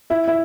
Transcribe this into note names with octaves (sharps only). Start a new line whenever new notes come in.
E4 E5
E4 E5